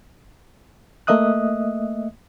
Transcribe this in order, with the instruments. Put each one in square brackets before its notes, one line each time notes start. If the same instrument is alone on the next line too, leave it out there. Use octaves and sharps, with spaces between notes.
[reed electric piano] A3 A#3 D#5 E5 D#6 F#6